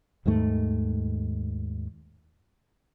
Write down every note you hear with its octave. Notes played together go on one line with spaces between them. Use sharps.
D#2 G#2 D#3 A3